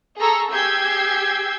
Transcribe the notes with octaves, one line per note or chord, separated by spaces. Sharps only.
G#4 A4 A#5 C#6 E6
G4 G#4 E6 G6 G#6 C7